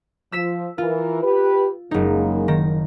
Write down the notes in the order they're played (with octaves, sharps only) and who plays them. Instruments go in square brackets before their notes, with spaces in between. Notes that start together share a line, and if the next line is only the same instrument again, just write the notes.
[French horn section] F3 [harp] E6 B6 E7
[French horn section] E3 A#4 [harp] F4
[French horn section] G4 B4
[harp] F#1 D#4 [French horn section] C#3 G#3 A#3
[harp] D#3 A#6